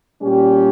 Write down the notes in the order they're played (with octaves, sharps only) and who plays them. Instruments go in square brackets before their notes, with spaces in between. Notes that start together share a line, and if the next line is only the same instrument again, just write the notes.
[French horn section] A#2 G3 C#4 G4